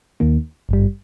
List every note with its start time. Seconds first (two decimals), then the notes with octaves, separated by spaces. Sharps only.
0.20 D#2 D#3 A#3
0.69 G#1 G2 G3